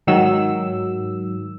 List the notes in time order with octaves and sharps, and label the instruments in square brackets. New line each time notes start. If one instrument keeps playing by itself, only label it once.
[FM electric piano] G#2 D#3 F#3 E6